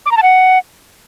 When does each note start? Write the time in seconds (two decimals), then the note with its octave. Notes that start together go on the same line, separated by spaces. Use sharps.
0.06 D6
0.11 A#5
0.17 A5
0.23 F#5